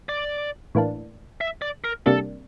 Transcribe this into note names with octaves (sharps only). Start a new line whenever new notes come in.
D5
A2 E3 A#3 D4
E5
D5
A#4
C3 G3 A#3 D4 A4